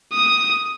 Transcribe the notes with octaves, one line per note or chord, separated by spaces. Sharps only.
D#6